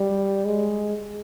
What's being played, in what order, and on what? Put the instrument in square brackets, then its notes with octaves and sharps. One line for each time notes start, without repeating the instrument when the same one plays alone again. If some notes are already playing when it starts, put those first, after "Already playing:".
Already playing: [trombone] G3
G#3